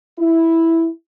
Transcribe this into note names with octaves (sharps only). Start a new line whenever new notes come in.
E4